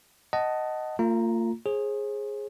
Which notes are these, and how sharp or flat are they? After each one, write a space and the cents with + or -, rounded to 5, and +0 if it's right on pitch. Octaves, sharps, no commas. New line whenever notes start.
D#5 +0 F#5 +20 A5 +0
A#3 -45 F4 +0 A#5 +0
G#4 +0 C5 +45